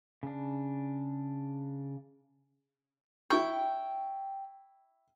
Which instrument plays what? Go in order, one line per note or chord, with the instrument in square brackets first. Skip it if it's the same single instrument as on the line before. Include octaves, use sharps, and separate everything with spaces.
[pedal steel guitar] C#3 D4
[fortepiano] E4 C#6 [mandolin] G5